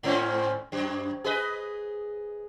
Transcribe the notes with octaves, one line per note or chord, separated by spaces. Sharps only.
G#2 C4 C#4
F#2
G#4 B4 D#5